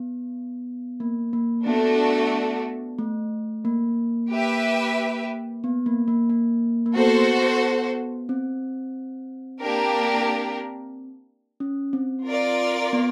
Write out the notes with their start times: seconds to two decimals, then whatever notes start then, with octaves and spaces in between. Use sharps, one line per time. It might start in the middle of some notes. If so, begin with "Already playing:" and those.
Already playing: B3
1.00 A#3
1.33 A#3
1.66 A3 B3 D4 F#4 A4
2.99 A3
3.65 A#3
4.31 G4 B4 E5
5.64 B3
5.86 A#3
6.08 A#3
6.30 A#3
6.86 A#3
6.96 B3 F#4 A4 C5
8.29 C4
9.62 A#3 D4 G4 A#4
11.60 C#4
11.93 C4
12.26 F4 A#4 D5
12.93 B3